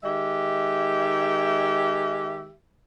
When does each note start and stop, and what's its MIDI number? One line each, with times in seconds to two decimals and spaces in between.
0.04 2.52 51
0.04 2.52 56
0.04 2.52 67
0.04 2.52 76